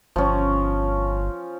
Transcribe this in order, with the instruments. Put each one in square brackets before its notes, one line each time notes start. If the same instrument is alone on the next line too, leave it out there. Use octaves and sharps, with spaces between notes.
[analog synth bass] G1 [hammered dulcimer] F3 C#4